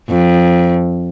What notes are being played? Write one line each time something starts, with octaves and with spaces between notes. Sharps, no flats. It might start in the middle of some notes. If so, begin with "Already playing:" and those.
F2